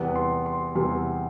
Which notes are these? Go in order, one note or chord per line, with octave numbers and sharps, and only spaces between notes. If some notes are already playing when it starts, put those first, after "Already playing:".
Already playing: E2 C3 G3 B3
C6
C6
E2 C3 G3 B3 C6